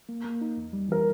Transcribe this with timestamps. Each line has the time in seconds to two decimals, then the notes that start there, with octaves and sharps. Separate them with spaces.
0.09 A#3
0.24 A#3
0.41 D#4
0.57 E2
0.73 G3
0.89 E3 A#4